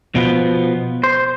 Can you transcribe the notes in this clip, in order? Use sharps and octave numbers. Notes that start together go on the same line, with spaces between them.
B2 F3 B3
C5